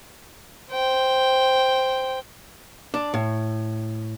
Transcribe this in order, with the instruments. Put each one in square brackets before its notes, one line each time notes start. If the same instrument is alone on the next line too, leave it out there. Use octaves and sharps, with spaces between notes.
[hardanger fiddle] C5 G5
[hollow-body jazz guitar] D4
A2